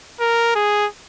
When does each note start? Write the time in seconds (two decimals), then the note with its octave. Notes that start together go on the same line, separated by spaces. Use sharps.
0.20 A#4
0.55 G#4